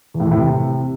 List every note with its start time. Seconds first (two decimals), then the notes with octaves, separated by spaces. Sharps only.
0.14 E2
0.20 A2
0.26 E2
0.31 A2
0.37 C3